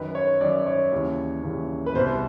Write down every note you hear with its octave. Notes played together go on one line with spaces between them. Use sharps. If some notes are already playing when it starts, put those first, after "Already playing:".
Already playing: F#2 D#3 B4
C#5
F#2 D#3 D5
C#5
D#2 C#3 E3
D#2 C#3 E3
B4
C2 B2 C5